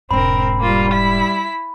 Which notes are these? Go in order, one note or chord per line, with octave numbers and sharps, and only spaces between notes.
E1 G#2 C4 A#4 B5
G3 A#3 F4
E4 B6